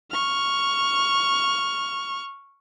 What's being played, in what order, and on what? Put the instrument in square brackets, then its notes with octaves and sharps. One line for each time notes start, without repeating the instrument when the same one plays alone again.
[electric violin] C#6 F6